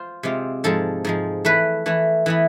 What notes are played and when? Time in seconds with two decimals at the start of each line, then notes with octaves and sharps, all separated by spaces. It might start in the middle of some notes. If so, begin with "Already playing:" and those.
Already playing: F4 C5
0.23 C3 G#3 C4 F4
0.64 G#2 F3 G#3 A4
1.05 G#2 F3 G#3
1.45 E3 A3 E4 B4
1.86 E3 A3 E4
2.26 E3 B3 E4